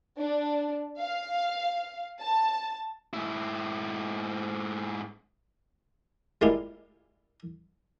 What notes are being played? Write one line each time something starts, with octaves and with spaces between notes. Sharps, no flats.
D4
F5
A5
G#2 E4
G3 G#3 A#3 E4 F4 G4